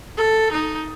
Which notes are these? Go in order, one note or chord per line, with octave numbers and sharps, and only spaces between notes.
A4
D#4